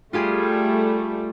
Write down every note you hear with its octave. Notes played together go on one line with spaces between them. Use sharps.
G3 A3 F4 G4 G#4